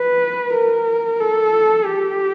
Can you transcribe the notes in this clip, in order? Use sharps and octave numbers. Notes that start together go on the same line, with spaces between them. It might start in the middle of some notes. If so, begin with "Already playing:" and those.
Already playing: B4
A#4
A4
G4